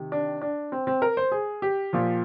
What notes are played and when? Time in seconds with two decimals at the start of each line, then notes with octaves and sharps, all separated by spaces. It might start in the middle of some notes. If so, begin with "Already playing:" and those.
Already playing: C3 D#3
0.12 D4
0.41 D4
0.72 C4
0.87 C4
1.02 A#4
1.17 C5
1.32 G#4
1.62 G4
1.93 A#2 F3